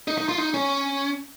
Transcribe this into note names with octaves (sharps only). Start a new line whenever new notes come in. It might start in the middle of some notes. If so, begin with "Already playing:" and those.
D#4
D#4
F4
D#4
C#4